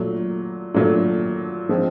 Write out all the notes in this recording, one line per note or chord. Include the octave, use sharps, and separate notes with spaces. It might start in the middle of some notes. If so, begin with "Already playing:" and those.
Already playing: A#2 F#3 A3
A#2 F#3 A3
F3 G#3 C4